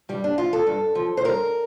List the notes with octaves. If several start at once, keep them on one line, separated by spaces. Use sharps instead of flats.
G2 G3
D4
F3 F4
A4
G2
F3
C5
G2 A#4